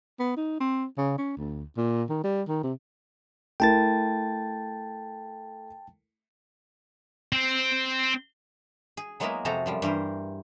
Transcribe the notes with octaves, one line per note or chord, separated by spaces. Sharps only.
B3
D#4
C4
C#3
C#4
D2
A#2
D#3
G3
D#3
C3
A3 E4 A#4 G5 A5 A6
C4 C5
G#4
F#3 G#3 A#3 B3 E4 A#4
F2 C3 F#4 G#4 A4 A#5
F#2 F3 G3
G2 E3 A#4 C5